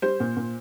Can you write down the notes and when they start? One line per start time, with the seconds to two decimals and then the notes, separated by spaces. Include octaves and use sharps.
0.02 G3 C5
0.20 A#2
0.37 A#2